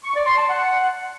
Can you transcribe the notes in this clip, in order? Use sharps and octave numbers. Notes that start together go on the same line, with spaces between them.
C#6
D5
C6
A5
F#5